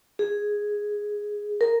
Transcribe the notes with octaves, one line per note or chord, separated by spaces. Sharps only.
G#4
A#4